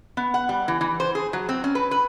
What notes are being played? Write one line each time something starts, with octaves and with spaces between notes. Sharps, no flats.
B3
F#5
G3
E3
E3
C5
G#4
F#3
C4
C#4
B4
B4